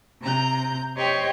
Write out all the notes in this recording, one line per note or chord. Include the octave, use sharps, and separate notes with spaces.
C3 A#5 G6
G4 C5 C#5 D#5 G5